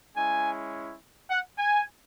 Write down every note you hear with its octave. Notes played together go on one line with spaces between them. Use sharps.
G#3 C#4 E4 G#5
F#5
G#5